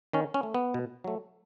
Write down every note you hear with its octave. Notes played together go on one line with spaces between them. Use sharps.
D#3 C#4
C#4
A3
B3
B2
F#3 A3